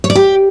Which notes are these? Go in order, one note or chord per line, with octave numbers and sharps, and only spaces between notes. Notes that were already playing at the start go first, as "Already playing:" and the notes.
C#5
D5
G4